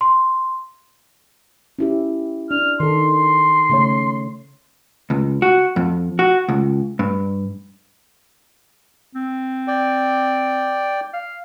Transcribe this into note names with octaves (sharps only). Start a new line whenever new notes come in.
C6
C#4 E4 G4
D4 F6
D#3 A4 C6
C#3 A3 C#5
C#2
F#4
F2
F#4
C#2
G2
C4
D5 G5
F5